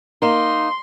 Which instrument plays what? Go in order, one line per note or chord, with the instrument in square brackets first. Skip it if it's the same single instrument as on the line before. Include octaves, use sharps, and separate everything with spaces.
[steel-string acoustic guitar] A#3 D#4 [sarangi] C6